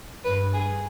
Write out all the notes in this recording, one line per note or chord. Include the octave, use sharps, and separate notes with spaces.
G2 B4
G#4